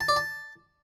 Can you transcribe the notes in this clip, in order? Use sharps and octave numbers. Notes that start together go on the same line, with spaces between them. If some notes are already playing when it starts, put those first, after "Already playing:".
A5
D5
A5